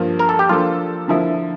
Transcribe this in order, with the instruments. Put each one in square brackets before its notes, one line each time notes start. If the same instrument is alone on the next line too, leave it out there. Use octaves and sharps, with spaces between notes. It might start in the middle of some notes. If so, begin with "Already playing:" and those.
Already playing: [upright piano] G2 F3 A#3 F4
[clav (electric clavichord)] A#4
A4
G4
[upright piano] F3 A#3 D4 A4 [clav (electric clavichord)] F4
[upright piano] D3 F3 A#3 E4